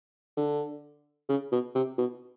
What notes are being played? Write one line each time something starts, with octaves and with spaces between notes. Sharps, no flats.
D3
C#3
B2
C3
B2